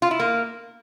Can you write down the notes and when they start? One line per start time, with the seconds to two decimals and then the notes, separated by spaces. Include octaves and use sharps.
0.02 F4
0.11 E4
0.20 A#3